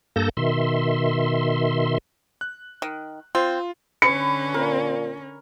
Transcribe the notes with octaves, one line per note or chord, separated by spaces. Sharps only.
G2 A#3 A4 A5 G6 A#6
B2 D#3 E5 C6
F#6
D#3
C4 F4
D3 C#4 B4 C#7
A#2 A#4